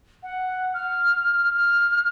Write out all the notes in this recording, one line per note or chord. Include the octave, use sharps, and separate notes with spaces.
F#5
F6
F6